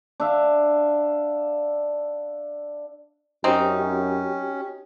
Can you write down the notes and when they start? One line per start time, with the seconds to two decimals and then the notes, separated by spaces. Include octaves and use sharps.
0.20 D4 E5 F5
3.44 F#2 C4 C#4 D#4 F#4 G4 G5